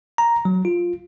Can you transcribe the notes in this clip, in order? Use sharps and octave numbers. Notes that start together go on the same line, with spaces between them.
A#5
F#3
F4